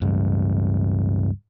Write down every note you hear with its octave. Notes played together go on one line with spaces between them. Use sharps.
C#2 G2